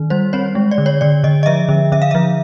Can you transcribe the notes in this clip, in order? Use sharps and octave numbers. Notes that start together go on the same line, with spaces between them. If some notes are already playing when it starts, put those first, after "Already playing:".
Already playing: D#3
G3 C5
C4 C#5
G#3
D5
D3
C#5
D3 D5
D3 D#5
D#5
F3 E5
D3
D3 E5
F5
F3 E5